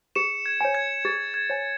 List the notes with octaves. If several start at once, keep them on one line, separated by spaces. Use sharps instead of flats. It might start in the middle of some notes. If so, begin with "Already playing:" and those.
G#4 C#7 E7
G#6
C#5 G#5
G#6
G#4 A6
G#6
C#5 G#5